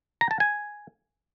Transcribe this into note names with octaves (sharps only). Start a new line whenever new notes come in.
A#5
A5
G#5